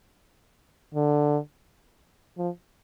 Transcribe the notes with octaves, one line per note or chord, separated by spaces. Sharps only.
D3
F3